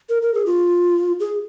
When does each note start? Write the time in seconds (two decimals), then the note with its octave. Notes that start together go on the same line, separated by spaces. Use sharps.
0.09 A#4
0.22 A#4
0.34 G#4
0.46 F4
1.20 G#4